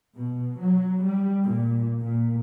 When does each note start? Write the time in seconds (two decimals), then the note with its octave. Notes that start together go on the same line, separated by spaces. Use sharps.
0.14 B2
0.59 F#3
1.03 G3
1.44 A#2
2.03 A#2